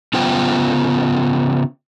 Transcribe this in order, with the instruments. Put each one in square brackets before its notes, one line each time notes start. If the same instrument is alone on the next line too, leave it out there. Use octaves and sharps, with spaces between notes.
[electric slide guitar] C#3 B3 F4 C5 G5